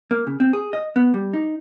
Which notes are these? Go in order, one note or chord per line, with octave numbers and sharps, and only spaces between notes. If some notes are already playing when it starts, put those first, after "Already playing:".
A#3
C#3
C4
G#4
D#5
B3
G3
D#4